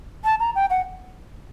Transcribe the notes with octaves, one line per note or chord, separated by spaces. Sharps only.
A5
A#5
G5
F#5